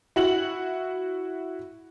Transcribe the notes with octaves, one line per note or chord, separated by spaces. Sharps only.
E4 F#4 F#7